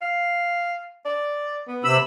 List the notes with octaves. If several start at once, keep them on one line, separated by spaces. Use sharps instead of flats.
F5
D5
B3
C3 B5 E6